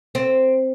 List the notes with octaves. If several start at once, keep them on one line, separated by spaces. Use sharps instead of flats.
C4